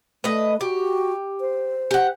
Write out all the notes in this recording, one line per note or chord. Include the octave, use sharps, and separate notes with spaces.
A3 B4 D#5
F#4 G4
C5
G4 F#5